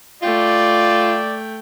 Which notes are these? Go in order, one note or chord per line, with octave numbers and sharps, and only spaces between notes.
A3 F4 D5 G5